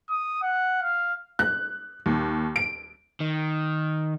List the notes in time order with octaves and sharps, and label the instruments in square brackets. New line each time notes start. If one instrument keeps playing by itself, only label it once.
[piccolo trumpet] D#6
F#5
F5
[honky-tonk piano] F#6
D#2
D7
[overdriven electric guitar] D#3